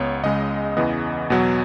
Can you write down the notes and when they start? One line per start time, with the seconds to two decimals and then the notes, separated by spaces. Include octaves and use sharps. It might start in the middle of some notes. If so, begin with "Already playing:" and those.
Already playing: C#2 B3 C#5
0.23 C#2 C#3 G#3 D#5
0.77 E2 C#3 E3 B3 D#5
1.30 E2 B2 F#3 B3